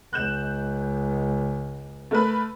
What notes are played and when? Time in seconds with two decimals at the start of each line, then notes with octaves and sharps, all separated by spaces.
0.13 C#2 F#6 G6 E7
2.11 A3 A#4 B4